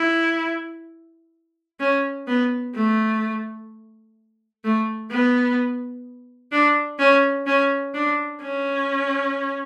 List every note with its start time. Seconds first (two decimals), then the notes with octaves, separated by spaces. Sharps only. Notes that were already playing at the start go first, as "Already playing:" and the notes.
Already playing: E4
1.80 C#4
2.28 B3
2.75 A3
4.64 A3
5.11 B3
6.52 D4
6.99 C#4
7.47 C#4
7.94 D4
8.42 C#4